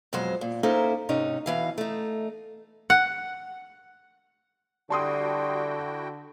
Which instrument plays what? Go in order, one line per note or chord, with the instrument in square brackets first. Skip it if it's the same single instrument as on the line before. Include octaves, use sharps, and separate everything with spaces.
[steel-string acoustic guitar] F2 B2 F#3 G#3 C5
A#2
A#3 C#4 D#4 E4 A4 C5
G#2 C3 C#4 D#4
B2 E3 F5
A3 D#4
[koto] F#5
[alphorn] D3 [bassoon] G3 [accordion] E4 F#4 G5 [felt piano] A5 C6 D#6